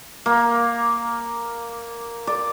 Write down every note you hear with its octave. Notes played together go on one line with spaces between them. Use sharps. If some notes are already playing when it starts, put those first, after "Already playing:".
A#3
D5